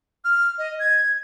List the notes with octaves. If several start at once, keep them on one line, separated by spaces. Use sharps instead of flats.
F6
D#5
G#6